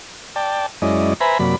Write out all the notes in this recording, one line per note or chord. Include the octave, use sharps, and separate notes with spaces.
D5 G5 A5
F#2 G#3 C#4 E4 D5 D#5
B4 C5 E5 G#5 A#5 B5
F#2 C3 F#3 A#3 D5 B5